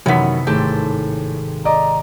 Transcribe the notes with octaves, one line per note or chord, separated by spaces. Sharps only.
F#2 C3 D#3 E3 B3 D#4 B6
G#1 A2 G4 A4 C6
D5 D#5 A#5 D6